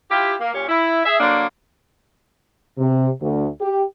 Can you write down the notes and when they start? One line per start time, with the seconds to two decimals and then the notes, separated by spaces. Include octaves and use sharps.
0.10 E4 F4 G4
0.41 A#3
0.54 A#2 C#4 G4 C#5
0.68 E4
1.06 G#4 E5
1.20 D3 F#3 A#3 D4
2.77 C3
3.21 D2
3.61 G4